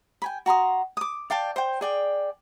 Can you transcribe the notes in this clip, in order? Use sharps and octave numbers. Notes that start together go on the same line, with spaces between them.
G5 G#5 B5
F#4 A#5 C6 D#6
D6 D#6
D5 F5 G5 A5
C5 G5
G#4 D5 G5